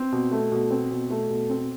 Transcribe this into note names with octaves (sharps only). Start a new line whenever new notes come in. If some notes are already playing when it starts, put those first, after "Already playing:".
Already playing: C4
B2
A3
B2
C4
B2
A3
B2
C4